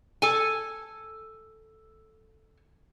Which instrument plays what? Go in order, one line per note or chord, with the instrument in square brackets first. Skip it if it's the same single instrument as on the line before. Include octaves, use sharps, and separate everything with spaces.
[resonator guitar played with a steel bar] A4 G#5